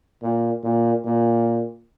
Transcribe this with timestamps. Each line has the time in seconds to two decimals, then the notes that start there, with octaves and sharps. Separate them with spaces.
0.22 A#2
0.63 A#2
1.05 A#2